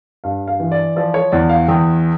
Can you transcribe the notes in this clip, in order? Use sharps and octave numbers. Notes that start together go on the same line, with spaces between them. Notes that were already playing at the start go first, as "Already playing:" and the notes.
G2 F5
F5
E3
D5
F3 D5
C#5
E2 D5
F5
E2 G5